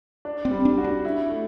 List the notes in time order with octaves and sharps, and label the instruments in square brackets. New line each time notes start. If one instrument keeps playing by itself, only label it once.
[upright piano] D4
[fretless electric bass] C4
[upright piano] G3
[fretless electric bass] D4
[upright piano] F#4
[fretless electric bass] D4
[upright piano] E4
A3